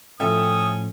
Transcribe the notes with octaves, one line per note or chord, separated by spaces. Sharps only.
A2 F3 C#4 A4 E5 G5 D#6